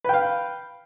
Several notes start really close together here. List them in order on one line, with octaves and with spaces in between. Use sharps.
B4 G5 F5